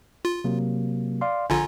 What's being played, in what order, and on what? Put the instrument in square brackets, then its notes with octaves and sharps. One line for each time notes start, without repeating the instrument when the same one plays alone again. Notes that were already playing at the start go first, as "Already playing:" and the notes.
[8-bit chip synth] F4
[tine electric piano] C3 F#3 A#3
D5 F5 C6
[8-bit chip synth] A#1 D3 F4 [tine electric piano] G#5 A#5